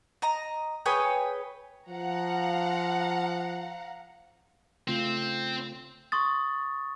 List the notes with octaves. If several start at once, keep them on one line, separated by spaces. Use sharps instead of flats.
D#5 A#5
G#4 B4 C#5 G5
F3 F5 F#5 A#5
C#3 A3 C4 F4
C6 C#6 D#6 A6